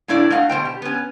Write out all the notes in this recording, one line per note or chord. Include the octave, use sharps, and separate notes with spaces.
A2 A#3 D4 E4 D5
A3 D#5 F5 F#5
B2 G#3 C5 G5
G4
B3 C#4